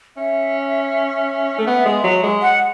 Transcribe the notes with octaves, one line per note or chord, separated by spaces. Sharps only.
C#4 E5
A3
B3
G#3
F#3
G#3
F#5